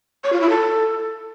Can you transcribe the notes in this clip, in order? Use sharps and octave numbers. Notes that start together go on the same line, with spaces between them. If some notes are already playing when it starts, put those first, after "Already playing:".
C#5
F4
E4
A4